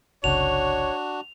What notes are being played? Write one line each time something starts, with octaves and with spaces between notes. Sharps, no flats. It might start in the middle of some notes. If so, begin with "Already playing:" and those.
F#1 C2 C#3 D4 F#4 C#5 F7